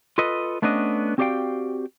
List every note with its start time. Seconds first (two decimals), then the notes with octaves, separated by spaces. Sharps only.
0.18 F4 A4 B4 D#5
0.62 A3 B3 C#4 D4 D#5
1.18 C4 F#4 G4 D5 F5 G5